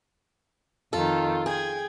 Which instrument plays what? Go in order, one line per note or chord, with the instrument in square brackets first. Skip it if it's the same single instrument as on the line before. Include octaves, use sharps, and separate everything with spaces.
[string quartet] F2 D#3 [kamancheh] F4 [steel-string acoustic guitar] A4
[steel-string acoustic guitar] G#4 [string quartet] G5 G#6